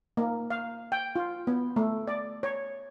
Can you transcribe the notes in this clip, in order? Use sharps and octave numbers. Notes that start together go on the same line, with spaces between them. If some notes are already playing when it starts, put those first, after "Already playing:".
A#3
F5
G5
F4
B3
A3
D5
C#5